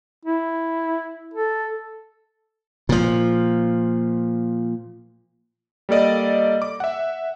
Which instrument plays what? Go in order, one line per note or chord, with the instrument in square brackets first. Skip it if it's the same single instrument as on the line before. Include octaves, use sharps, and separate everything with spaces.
[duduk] E4
A4
[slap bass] A#2 F3
[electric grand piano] G3 A#3 A4 D5 D#5
D6
E5 F#5